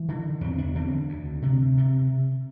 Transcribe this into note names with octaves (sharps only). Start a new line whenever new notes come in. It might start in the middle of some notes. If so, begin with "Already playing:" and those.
Already playing: E3
D3
E2 C4
D4
D3 C4
D2
C3
C3